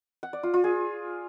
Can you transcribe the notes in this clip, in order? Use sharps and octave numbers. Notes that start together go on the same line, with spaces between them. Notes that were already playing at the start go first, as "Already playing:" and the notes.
F#5
D5
F4
F4
G#4